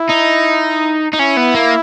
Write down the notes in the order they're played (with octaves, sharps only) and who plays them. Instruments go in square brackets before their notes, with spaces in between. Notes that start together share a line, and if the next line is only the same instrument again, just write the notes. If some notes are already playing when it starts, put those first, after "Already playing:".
Already playing: [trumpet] E4
[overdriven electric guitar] D#4
D#4
[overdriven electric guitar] C#4 [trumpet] E4
[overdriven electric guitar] B3
A#3